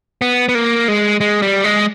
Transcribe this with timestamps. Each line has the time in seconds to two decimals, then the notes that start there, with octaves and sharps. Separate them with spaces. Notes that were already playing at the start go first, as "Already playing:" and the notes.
0.22 B3
0.49 B3
0.55 A#3
0.88 G#3
1.20 G#3
1.42 G3
1.64 G#3